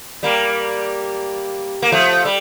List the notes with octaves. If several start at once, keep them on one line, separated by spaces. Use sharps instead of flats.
G3 A#3
A#3
F3 A3
G3